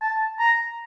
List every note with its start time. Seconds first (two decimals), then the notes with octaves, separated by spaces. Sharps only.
0.02 A5
0.39 A#5